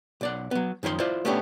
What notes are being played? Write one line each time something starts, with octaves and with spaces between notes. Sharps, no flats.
B1 D5 F#5
F#3 B3
F#2 D#3 F3 C#5 C6
E4 F4 C5 D5
A3 B3 C#4 D4 G4